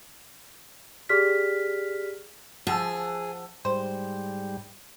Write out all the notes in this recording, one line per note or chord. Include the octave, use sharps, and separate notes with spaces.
G4 G#4 D5 F6 B6
F3 G#4 F#5 A5 E6
G#2 G3 C5